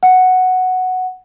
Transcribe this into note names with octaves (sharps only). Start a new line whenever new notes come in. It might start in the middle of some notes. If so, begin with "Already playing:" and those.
F#5